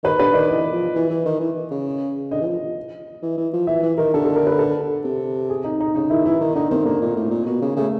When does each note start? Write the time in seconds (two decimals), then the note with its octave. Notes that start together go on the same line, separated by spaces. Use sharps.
0.04 D#3 B4
0.19 D3 B4
0.34 D#3 D5
0.49 E3 D#5
0.72 F3
0.95 E3
1.10 E3
1.25 D#3
1.40 E3
1.71 C#3
2.31 D3 D#5
2.41 E3
2.47 F3
3.23 E3
3.38 E3
3.53 F3
3.67 E3 E5
3.83 E3
3.98 D#3 A#4
4.14 D3 A4
4.25 A4
4.36 A#4
4.47 B4
4.59 A4
5.05 C3
5.50 G#4
5.64 D#4
5.80 D#4
5.95 C#3 D#4
6.10 D#3 E4
6.25 E3 E4
6.41 D#3 D#4
6.55 D3 D#4
6.71 D#3 C4
6.85 D3 A#3
7.02 A#2
7.16 A2
7.31 A#2
7.46 B2
7.62 C#3
7.76 C#3 A3